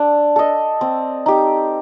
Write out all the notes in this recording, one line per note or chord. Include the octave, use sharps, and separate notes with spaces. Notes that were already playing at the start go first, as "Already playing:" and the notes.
Already playing: D4 A4
A4 D#5
C4
D#4 G4